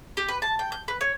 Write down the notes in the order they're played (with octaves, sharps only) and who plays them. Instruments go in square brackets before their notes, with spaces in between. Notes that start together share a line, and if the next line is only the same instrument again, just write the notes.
[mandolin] G4
B4
A5
G5
G6
B4
C#5